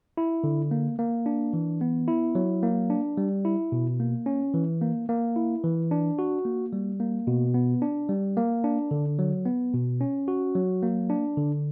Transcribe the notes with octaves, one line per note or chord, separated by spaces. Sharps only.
E4
D3
A#3
A#3
D4
E3
B3
E4
F#3
A#3
D4
G3
E4
B2
A#3
C#4
E3
A#3
A#3
E4
E3
D4
F#4
A#3
G3
A#3
B2
B3
D4
G3
A#3
D4
D3
F#3
B3
B2
C#4
F#4
F#3
A#3
D4
D3